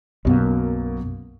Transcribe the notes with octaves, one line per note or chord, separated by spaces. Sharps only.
B1 F#2 B2 F#3 A#3